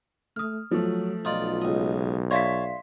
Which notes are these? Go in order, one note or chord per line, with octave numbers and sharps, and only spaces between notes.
A3 D#6 F6
F3 F#3 A3
B1 D#4 F4 D5
C#2 D#5
C#5 D5 E5 F5 A5 C6 B6